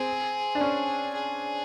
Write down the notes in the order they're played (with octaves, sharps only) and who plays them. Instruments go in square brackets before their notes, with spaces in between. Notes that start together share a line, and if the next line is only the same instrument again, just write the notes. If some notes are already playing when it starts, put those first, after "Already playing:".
Already playing: [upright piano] C4 [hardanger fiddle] G#4
[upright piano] D4
C#4
[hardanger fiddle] G#4